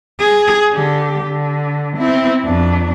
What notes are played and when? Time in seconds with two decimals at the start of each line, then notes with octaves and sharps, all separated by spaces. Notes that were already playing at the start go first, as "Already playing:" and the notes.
0.20 G#4
0.72 D3 G4
1.24 D3
1.97 C4 E4
2.45 F2 D4